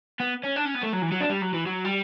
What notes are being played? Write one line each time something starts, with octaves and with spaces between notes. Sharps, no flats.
B3
C#4
D4
C#4
B3
A3
F#3
E3
F#3
D4
G3
F#3
E3
F#3
G3